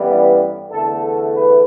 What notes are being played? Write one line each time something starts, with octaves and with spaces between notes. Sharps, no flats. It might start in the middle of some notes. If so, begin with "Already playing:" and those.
Already playing: A1 G2 E3 G3 B3
E2 D3 A3 A4
A4
B4